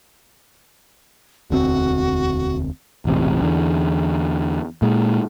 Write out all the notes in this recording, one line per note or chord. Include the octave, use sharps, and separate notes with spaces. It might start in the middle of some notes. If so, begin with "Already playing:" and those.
E1 D2 C4 F#4
E1 A1 C3
E2 D3
A#2 G#3